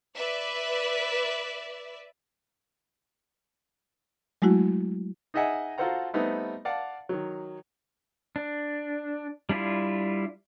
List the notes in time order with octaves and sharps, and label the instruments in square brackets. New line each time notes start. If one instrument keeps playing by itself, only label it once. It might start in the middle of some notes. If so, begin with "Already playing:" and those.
[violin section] B4 D5 E5
[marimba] F#3 G#3 A3 E4 F#4
[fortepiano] D#4 G#4 D#5 E5 F#5 G#5
F4 F#4 A4 C5 F#5 A#5
G3 A3 B3 C4 D#4
D5 F5 F#5 A5
D#3 F#3
[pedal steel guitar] D4
G3 D4 E4 F4